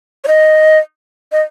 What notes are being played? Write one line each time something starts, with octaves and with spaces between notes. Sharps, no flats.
C#5
D#5
D#5